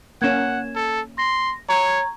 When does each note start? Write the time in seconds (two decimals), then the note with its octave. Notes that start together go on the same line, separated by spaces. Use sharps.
0.22 A#3 C#4 F#5 G#6 E7
0.75 A4
1.18 C6 A#6
1.69 C#5 A#5 C#6 G#6